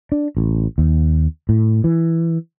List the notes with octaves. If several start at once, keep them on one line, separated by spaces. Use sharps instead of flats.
D4
A1
D#2
A2
E3